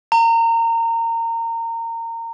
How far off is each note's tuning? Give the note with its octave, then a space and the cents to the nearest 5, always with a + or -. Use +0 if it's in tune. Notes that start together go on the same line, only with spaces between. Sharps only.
A#5 -25